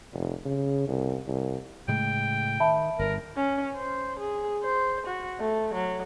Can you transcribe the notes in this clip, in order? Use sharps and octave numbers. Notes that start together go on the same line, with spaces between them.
F1
C#3
C2
C2
A2 C#3 G#3 G5
D#3 E5 A5 B5
G1 A#4
C#4
C5
G#4
C5
F#4
A3
F#3